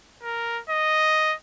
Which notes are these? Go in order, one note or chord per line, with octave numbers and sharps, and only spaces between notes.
A#4
D#5